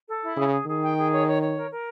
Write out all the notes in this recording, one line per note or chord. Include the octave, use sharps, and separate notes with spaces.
A4
E4
C#3 G#4
G#4
D#3 G#4
G5
G#4
C#5
C#5
C#5
A#4
A#4